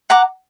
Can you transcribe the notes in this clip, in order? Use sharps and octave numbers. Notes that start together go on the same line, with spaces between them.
F#5 A#5 D6